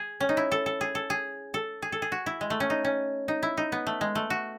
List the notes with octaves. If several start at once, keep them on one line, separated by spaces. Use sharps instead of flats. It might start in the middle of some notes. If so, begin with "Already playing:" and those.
Already playing: G#4
C#4
D#4
E4
A4
A4
G#4
A4
G#4
A4
G#4
A4
G#4
F#4
E4
G#3
A3
C#4
D#4
C#4
D#4
E4
D#4
B3
A3
G#3
A3
F#4